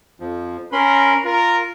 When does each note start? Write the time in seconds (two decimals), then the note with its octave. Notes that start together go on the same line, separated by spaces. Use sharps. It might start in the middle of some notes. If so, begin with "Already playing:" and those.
0.20 F2 F3
0.72 C#4 A#4 B5 C6
1.24 F4 A#4